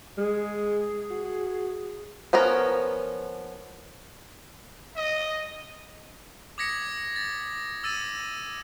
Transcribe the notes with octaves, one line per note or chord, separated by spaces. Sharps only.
G#3 G#4
F#4
F3 B3 C#4 A#4
D#5
D6 D#6 G#6 A#6 B6 C#7
A6
D6 E6 A6 D#7 F#7